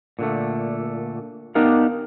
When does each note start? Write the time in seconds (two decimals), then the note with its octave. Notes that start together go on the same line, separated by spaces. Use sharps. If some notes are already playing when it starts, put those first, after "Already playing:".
0.19 A#2 D3 A3
1.55 B3 D4 D#4 G4 A#4 F5